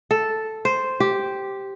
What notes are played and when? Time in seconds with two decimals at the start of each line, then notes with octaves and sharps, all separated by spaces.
0.11 A4
0.65 C5
1.00 G4